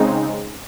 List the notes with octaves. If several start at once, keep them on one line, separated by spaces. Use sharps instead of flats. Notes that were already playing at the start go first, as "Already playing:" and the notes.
Already playing: C#3 G#3 C4 D#4